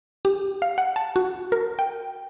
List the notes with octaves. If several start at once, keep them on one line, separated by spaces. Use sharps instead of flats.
G4
F5
F#5
A5
F#4
A#4
G5